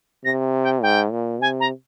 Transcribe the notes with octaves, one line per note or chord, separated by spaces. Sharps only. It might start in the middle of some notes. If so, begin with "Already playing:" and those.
C3 A#6
G5
G#2 G5
A#2
C3 G#5
A#5